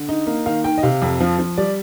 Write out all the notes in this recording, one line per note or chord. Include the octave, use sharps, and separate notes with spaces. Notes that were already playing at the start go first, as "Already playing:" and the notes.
Already playing: D3
D#4
A#3
D#3 F5
D#3 G5
D#5
C3 F5
F2
F3
F3
G3 D5